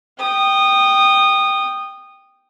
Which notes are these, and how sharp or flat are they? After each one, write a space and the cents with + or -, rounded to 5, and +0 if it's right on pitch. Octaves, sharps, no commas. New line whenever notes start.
G5 +0 D#6 -20